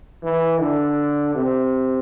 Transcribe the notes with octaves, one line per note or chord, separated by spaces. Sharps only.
E3
D3
C3